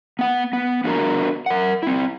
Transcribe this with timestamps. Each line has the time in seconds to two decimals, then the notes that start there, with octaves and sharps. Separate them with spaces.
0.19 B3 F#5
0.53 B3
0.84 B3 D4 F#4 A#4 A#5
1.46 A#4 F#5
1.83 C4 E4